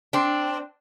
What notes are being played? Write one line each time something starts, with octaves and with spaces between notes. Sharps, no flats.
C4 D4